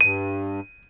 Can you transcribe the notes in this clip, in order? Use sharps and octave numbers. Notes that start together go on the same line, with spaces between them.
G2 D#7